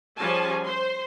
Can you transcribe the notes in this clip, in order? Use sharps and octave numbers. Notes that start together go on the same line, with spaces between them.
F3 G3 C#4 G#4 G#5 A5
C5 C6